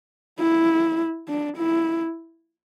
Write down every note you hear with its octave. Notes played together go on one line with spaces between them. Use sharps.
E4
D4
E4